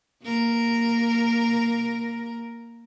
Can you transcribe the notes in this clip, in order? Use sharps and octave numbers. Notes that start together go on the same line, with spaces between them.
A#3 A#4